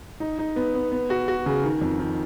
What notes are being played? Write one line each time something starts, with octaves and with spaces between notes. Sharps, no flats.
D#4
D#4
B3
B3
B3
F#4
F#4
C#3
D#3
F2
D#3